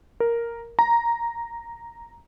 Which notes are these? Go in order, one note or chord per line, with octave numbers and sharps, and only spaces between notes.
A#4
A#5